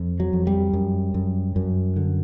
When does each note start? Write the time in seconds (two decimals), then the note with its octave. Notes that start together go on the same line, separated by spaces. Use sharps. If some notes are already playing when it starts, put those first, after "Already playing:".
Already playing: F2
0.20 F#3
0.33 F2
0.47 G3
0.73 F#2
1.14 F#2
1.56 F#2
1.96 D3